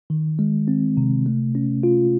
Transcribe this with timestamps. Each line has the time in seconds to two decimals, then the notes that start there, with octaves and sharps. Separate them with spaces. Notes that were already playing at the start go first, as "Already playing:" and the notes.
0.10 D#3
0.39 G#3
0.68 C4
0.97 C3
1.26 A3
1.55 C#4
1.83 F4